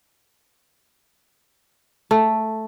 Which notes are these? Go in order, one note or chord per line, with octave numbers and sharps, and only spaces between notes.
A3